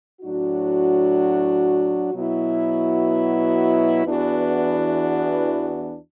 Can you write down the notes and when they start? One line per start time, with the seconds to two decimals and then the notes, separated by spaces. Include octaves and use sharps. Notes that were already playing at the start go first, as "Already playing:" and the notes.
0.22 A2 F#3 D4 F#4
2.14 B2 F#3 B3 E4
4.06 E2 E3 B3 D4 F#4